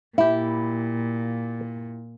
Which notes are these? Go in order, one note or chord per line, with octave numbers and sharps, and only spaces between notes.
A#2 E4 G4 E5